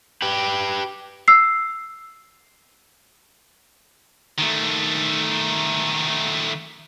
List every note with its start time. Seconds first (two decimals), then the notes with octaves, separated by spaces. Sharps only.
0.22 G4 B4
1.28 E6 C7
4.38 D#3 A3